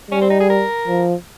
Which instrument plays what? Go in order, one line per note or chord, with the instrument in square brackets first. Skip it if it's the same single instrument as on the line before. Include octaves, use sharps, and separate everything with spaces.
[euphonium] G3 [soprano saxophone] C#4
[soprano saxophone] C4
D#4
G#4
A#4
[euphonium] F3